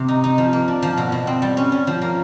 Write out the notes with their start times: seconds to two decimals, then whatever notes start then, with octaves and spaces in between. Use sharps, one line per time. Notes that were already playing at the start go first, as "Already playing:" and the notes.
Already playing: C3 C4
0.08 D#4
0.24 D#4
0.38 F3
0.53 A#3
0.68 D4
0.82 F3
0.97 B2
1.12 B2
1.27 C4
1.42 G3
1.57 C#4
1.72 C#4
1.87 F3
2.02 A#3